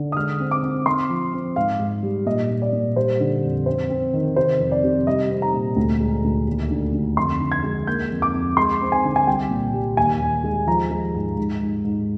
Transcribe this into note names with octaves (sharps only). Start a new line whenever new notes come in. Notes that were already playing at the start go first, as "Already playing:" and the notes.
Already playing: D3
D#6
G#3 F6
C4
D6
C4
C4 C6
F3
C4
G#2 F5
G#2
G3
A#2 D#5
A#2
D5
A#2
G3 C5
D3
F2
C4 C5
C4
D#3
C3 C5
F2
D5
C3
G3 D#5
C4
A#5
A#2
D2
G#3
D2
D#2
D3
D3
F2 C6
D3
G#6
G#3
A#3 G6
F2
D6
F2
G#3 C6
C4
G#5
D3
G#5
C2 G5
A#2
G3
D#2 G#5
D#2
G#3
F3 A#5
G#3
G#2
G#2
G#2
G#2